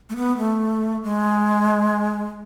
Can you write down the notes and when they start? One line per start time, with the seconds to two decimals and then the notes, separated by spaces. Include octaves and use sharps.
0.10 A3
0.16 B3
0.38 A3
1.04 G#3